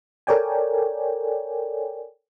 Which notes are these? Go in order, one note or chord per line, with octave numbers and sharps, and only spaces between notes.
A4 A#4 C#5 D5 G5 G#5